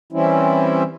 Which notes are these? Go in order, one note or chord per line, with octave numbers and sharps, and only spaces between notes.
E3 G3 C4 C#4 E4